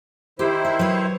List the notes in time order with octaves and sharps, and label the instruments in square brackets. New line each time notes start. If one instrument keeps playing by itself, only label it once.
[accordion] D#3 E4 C5 [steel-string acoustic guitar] G4
[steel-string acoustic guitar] E5
F#3 B4 C#5